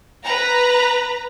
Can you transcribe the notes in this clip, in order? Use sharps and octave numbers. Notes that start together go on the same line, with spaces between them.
B4 A#5